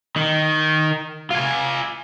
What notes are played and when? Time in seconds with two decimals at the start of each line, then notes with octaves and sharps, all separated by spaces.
0.16 D#3
1.30 F4 G#5